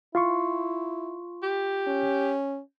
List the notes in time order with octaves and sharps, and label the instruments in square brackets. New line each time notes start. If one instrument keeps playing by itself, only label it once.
[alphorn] E4 [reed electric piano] F4 C6 C#6
[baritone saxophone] G4
[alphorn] C#4